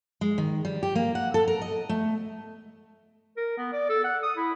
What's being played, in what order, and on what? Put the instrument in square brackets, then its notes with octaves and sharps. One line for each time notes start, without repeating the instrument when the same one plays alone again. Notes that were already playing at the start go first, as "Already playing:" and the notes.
[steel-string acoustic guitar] G#3
D#3
G3
G4
A#3
F#5
A4
A#4
D#5
A3
[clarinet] A#4
B3
D5
A4
F#5
D#6
E4